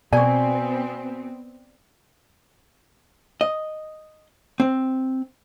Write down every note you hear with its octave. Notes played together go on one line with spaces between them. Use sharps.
B2 B3 C4 F#4 D5 G#5
D#5
C4